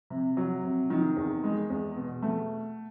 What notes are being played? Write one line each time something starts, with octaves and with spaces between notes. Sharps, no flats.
C3
F#3
C3
D#3
E2
G#3
E2
B2
A3